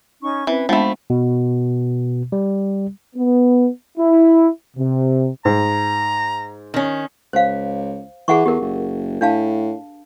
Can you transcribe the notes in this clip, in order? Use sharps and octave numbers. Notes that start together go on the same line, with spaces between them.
C#4 D#4 C#6
E3 C4 C#4 B4 C5
F3 G#3 A3 B3 D4 B5
B2
G3
B3
E4
C3
G#2 A#5
D#3 C#4
C#2 C5 F5
E3 G#4 F#5 C#6
E2 G4 A#4
F#1
A2 D4 F5 A5